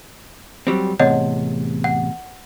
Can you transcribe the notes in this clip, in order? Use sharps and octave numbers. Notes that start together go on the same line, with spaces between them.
F#3 G3 C4
E2 A2 C3 C#5 D#5 F#5
F#5